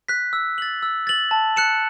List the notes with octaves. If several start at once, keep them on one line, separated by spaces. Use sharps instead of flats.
F#6 B6
E6
A6 F#7
E6
A6 F#7
A5
F#6 C#7 E7